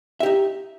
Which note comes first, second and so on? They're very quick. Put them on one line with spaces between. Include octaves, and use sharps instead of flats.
E5 G4 D#4